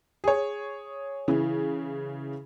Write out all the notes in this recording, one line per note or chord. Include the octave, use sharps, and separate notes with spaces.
G#4 C#5
C#3 E3